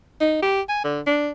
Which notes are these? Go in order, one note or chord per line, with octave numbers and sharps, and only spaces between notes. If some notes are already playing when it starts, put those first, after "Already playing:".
D#4
G4
G#5
D3
D4